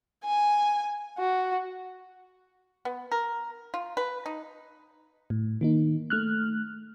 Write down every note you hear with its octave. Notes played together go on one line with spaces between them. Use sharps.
G#5
F#4
B3
A#4
F4
B4
D#4
A2
D#3 A#3 D#4
A3 F6 F#6